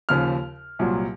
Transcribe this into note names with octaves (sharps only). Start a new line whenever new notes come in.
D#2 C#3 F3 F6
C2 A#2 F#3